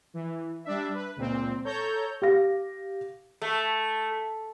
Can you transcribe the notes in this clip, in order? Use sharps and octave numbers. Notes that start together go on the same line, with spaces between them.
E3
G3 D4 E5
B4
C#2 A#2 C4
A4 C#5 A#5 G6
G4 F5 A#6
A3